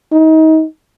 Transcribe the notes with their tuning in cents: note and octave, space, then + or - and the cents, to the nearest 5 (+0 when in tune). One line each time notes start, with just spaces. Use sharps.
D#4 +30